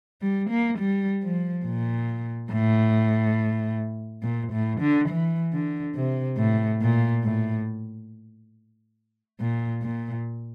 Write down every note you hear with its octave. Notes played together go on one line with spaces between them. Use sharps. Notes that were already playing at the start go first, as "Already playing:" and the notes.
G3
A#3
G3
F3
A#2
A2
A#2
A2
D3
E3
D3
C3
A2
A#2
A2
A#2
A#2